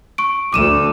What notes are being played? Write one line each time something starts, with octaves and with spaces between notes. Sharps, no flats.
C#6 D7
D2 A3 D6 D#7 E7